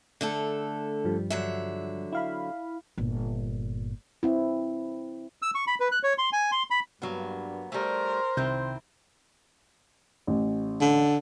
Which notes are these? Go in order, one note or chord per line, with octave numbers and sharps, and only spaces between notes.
D3 A3 A4
G2 F3 G3
D3 F#3 E5
E4 F5 B5
G1 A#2
C4 E4
E6
C#6
B5
B4
F#6
C#5
C6
G#5
C6
B5
G2 F#3 A#3 B3
G3 A3 A#4 C5
C2 C3 D#3 C4 E4 G6
A1
D3